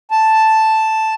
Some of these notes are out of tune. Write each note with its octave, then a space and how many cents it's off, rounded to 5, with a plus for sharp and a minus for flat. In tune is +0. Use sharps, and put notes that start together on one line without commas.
A5 +0